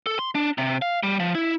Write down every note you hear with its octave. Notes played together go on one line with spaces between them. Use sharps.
A4
C6
D4
C3
F5
G3
F3
E4